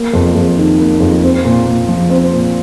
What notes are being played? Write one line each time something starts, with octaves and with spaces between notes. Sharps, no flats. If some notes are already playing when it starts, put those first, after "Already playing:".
Already playing: A#3
F2
F2
D#3
A#3
F2
C4
A#2
A#2
F3
C4
A#2